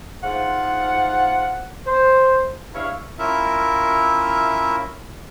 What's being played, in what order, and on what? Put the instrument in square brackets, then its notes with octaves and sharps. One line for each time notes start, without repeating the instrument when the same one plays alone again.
[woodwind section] G#2 F4 F#5
C5
G2 E4 C#5 F5
[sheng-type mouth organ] C#4 E4 F4 A#4 E5